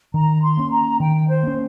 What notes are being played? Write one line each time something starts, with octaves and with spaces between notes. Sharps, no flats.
D#3 A#5
C6
A#3 C#4
A#5
D#3 G5
C5
A#3 C#4